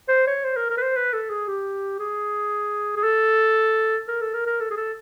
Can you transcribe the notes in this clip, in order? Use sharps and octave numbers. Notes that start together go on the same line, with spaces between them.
C5
C#5
C5
A#4
A#4
B4
C5
B4
A4
G#4
G4
G#4
G#4
A4
A#4
A4
A#4
A#4
A4
G#4
A4